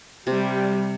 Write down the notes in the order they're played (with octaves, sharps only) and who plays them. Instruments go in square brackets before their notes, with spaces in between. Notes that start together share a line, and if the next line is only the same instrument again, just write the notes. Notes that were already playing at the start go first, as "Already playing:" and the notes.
[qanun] C3 [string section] G3